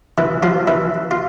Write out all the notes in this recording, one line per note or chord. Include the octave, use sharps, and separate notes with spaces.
E3 E4
F3 F4
E3 E4
F4